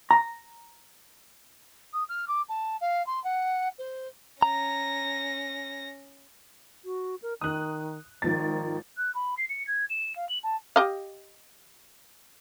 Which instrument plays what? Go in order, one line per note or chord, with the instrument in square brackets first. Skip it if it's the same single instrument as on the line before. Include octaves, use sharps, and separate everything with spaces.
[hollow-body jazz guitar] A#5
[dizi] D#6
F6
D6
A5
F5
C6
F#5
C5
[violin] C#4 A#6 [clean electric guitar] A#5
[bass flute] F#4
A#4
[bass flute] D#3 [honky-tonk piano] D#6 F#6
[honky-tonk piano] G#1 F3 A6 [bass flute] D#3
[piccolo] F#6
B5
C7
C#7
G#6
E7
F5
F#7
A5
[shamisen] G4 D#5 F5